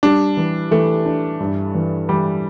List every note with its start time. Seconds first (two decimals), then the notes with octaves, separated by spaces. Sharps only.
0.03 G3 D4
0.37 E3
0.71 E3 A3
1.06 D4
1.40 G2
1.75 E3
2.09 E3 G3